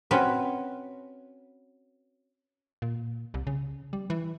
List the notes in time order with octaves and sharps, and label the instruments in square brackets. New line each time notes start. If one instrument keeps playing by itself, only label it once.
[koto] C4 C#4 F#4 B4
[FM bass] A#2
C2
C#3
G3
E3